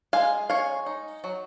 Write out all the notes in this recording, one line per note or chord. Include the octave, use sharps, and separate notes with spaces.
G#3 F5 G#5
C#4 C#5 F5
D#4
F#3